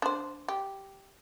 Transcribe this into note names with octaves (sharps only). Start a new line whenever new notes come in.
D4 C5
G4